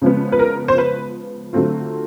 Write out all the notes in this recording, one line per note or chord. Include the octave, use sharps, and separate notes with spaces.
C#3 F3 G#3 B3
B4
A#4
C5
B4
D3 F#3 A3 C4 F4